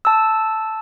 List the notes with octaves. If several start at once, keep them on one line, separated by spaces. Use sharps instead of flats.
A5 E6